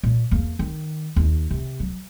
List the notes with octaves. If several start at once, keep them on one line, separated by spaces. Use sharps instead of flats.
A#2
E2 A#3
D#3
D#2
C3
F#3